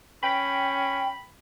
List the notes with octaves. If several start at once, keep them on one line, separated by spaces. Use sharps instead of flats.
C#4 G5 B5